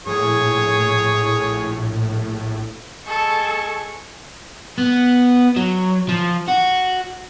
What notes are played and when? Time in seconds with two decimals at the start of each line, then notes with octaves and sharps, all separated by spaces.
0.06 A#1 A2 G#4 C#5
3.07 G#3 A4 C#6
4.78 B3
5.56 F#3
6.09 F3
6.48 F#4